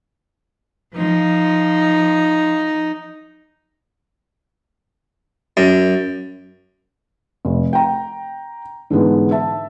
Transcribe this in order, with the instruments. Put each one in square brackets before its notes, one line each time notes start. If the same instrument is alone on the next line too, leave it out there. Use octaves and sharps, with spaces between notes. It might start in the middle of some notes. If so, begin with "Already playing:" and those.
[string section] F3 [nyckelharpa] D#4
[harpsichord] F#2
[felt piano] F1
G5 A#5
G#2 D3 E3 G#3 B3
E5 A5